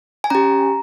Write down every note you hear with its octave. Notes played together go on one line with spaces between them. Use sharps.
G#5
C#4 G4 A#5